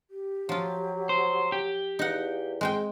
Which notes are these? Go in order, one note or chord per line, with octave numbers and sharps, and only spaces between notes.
G4
F3 F#3 F4
C5
G4
E2 D#4 F5 F#5
G#3 C4 G#4 G5